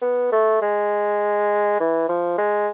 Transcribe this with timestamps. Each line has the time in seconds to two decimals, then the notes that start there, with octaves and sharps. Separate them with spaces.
0.01 B3
0.32 A3
0.61 G#3
1.80 E3
2.09 F3
2.38 G#3